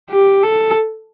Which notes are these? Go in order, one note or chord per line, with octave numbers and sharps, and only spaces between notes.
G4
A4